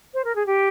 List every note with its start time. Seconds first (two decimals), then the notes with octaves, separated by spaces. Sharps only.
0.14 C5
0.25 A#4
0.36 G#4
0.46 G4